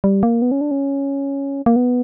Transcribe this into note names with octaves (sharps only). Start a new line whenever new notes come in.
G3
A#3
B3
C#4
D4
C#4
A#3
B3